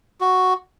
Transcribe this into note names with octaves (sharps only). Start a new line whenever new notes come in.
F#4